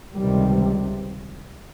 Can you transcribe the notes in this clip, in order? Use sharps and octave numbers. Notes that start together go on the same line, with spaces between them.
C#2 C3 D#3 G3